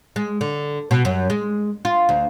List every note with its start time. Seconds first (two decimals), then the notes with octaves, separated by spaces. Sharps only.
0.16 G#3
0.41 D3
0.91 B2
1.05 F#2
1.30 G#3
1.85 F4
2.09 D2